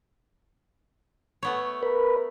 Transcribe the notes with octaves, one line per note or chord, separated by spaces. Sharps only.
A3 B3 C#5
A#4 B4